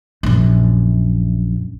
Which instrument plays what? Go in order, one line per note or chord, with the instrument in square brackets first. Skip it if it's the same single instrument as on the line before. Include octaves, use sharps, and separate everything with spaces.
[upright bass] A#1 F#2